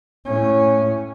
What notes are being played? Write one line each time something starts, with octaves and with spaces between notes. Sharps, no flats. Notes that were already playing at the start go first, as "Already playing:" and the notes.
A2 C#4